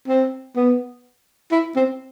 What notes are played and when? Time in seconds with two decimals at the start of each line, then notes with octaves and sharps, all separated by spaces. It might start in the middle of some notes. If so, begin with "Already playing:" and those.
0.08 C4
0.56 B3
1.51 E4
1.76 C4